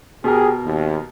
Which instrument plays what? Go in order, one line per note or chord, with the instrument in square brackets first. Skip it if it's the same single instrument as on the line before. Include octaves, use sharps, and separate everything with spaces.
[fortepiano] B2 A#4 [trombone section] G4 G#4
[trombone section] D#2